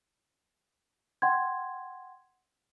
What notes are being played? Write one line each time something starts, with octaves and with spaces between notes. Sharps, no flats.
F#5 G5 C6 G#6